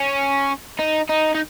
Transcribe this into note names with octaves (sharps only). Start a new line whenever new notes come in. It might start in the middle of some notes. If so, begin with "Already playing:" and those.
Already playing: C#4
D#4
D#4
D#4